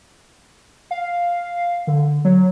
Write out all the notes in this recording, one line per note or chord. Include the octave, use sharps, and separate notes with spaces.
F5
D3
F#3